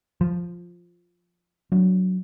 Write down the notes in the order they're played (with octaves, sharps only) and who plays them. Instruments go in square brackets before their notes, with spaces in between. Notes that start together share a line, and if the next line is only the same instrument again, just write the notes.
[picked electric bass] F3
[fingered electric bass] F#3 D4